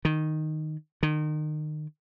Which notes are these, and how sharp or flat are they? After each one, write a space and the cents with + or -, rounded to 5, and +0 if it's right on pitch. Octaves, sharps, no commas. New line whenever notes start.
D#3 -5
D#3 -30